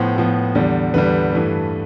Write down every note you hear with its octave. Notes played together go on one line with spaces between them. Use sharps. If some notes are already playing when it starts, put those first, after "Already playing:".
Already playing: A2 F3 B3 C5
A2 F3 B3
E2 D3 G3
E2 D3 G3 B4
G2 E3 A3